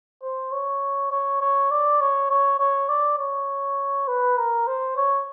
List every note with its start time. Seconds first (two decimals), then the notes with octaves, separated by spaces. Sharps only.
0.23 C5
0.52 C#5
1.12 C#5
1.41 C#5
1.71 D5
2.01 C#5
2.30 C#5
2.60 C#5
2.89 D5
3.19 C#5
4.08 B4
4.37 A#4
4.67 C5
4.97 C#5